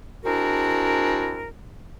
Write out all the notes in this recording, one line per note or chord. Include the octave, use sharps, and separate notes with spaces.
G#3 C4 D4 E4 F#4 A#4